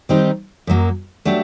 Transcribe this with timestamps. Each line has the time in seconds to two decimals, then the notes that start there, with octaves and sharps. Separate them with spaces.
0.09 D#3 G3 C4 D#4 G4
0.67 F#2 F#3 A#3
1.25 F#3 A3 D4 G4